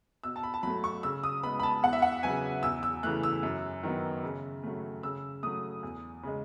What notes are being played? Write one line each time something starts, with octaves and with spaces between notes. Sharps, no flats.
B2 E6
A5
B5
A5
F#3 A3 B5
C#6
C#3 E6
D#6
G#3 B3 B5
B5
A5
E2 F#5
E5
F#5
C#3 F#3 B3 G#5
E2 E6
E6
C#3 E3 A3 F#6
E6
F#2
D#3 F#3 B3
C#3
F#3 A3
C#3 E6
F#3 A3 D#6
E2
C#3 G#3